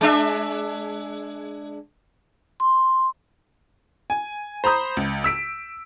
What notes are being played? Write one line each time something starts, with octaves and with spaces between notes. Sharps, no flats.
G#3 D4 E5
C6
G#5
C5 A#5 B5 D#6 G6
C#2
E6 B6 D7